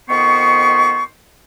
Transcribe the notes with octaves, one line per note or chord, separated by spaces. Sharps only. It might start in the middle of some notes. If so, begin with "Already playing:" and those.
F2 D#3 B3 C5 C#6